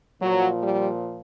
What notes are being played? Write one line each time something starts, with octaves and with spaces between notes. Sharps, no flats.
A#2 F3 F#3
G3